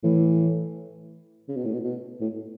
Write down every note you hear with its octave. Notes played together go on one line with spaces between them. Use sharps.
A2 E3
C#3
B2
A2
B2
B2
A2